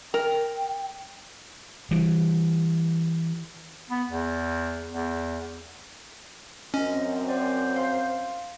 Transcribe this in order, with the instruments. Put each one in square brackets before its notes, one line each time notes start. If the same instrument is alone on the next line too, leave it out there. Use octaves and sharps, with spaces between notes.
[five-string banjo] A#4 [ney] G5
[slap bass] E3 G3
[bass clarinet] B3
E2
E2
[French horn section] F#2 C4 [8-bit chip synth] C#4 [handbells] D#5
[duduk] C5 [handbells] D5
[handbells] F5 C6